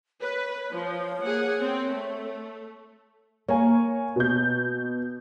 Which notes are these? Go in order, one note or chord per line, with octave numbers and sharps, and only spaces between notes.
B4 C#5
F3
A#3 G#4 F#5
C4
A3
A#3 C#5 G#5
B2 G6